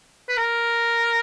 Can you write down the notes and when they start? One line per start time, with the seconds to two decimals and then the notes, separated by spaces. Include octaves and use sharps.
0.29 B4
0.37 A#4